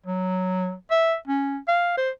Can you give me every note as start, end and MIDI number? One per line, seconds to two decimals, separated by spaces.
0.06 0.73 54
0.91 1.15 76
1.28 1.58 61
1.68 1.97 77
1.97 2.10 72